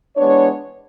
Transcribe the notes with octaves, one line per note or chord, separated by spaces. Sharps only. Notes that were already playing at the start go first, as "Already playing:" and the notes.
E3 G#3 B3 D4 C#5